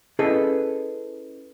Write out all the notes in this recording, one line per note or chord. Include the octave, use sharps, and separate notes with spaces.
C#4 E4 G#4 A4 B4 D#5